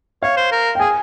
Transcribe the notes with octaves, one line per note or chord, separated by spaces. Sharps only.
C#5 F5
C5
A#4
G5
G#4 G#5